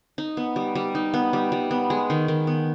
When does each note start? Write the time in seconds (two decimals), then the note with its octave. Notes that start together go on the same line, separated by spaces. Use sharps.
0.18 D#4
0.37 B3
0.56 G3
0.75 G3
0.95 D#4
1.14 B3
1.33 G3
1.52 G3
1.71 B3
1.90 G#3
2.10 D#3
2.28 D#3
2.47 B3